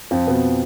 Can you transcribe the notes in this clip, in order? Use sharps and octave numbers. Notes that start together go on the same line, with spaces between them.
F2 F3
B2 B3